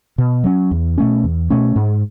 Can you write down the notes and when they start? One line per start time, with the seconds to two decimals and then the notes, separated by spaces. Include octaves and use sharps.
0.18 B2
0.44 F#3 C#4
0.71 E2
0.98 B2 A3 C#4
1.24 E2
1.50 B2 A3 C#4
1.76 G#2